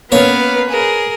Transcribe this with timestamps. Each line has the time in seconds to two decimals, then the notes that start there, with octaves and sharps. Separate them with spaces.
0.12 A#3 B3 C#4 B4 C#5 F5
0.69 G#4 A#4